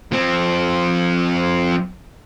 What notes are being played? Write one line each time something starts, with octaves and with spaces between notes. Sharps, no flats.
F3 C4